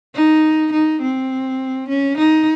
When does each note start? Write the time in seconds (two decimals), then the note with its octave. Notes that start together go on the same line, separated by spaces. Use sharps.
0.15 D#4
0.72 D#4
1.01 C4
1.89 C#4
2.17 D#4